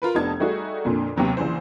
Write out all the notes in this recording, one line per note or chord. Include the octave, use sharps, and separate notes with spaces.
F4 A#4 B4
F1 B3 D4 D#4 A5 G#6
G3 A3 D#4 F#4 G#4
F2 A#2 D3
D#2 C3 F#3 B3
A#1 C#3 E3 C5